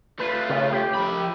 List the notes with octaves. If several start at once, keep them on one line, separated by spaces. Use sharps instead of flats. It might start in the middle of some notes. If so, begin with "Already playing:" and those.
A3 F4 B4
C#3
G4
F3 B5